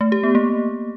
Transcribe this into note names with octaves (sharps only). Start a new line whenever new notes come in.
A3
G4
B3
A#3